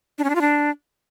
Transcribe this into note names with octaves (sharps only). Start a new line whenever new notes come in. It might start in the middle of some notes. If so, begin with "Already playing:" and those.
D4
C#4
D4
F4
D4